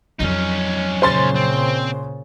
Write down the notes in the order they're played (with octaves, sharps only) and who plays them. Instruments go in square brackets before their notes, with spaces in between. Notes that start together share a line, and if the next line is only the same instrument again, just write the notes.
[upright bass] F2 F#3 [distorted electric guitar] C#4 D#4
[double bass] A#2 C#3 [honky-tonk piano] C5 C6 A6
[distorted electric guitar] C4